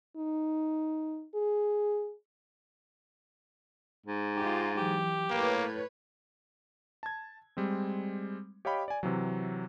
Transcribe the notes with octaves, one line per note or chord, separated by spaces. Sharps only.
D#4
G#4
G#2
D#4 F4 G4
E3 F#3 G4
A2 A#3 B4 C#5
A5 G#6
G3 G#3 C4
G4 C#5 D#5 F5 G5 B5
D5 G#5
C3 E3 F#3